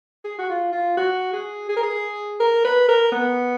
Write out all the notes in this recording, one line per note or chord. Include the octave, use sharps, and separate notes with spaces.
G#4
F#4
F4
F4
F#4
G#4
G#4
A#4
G#4
A#4
B4
A#4
B3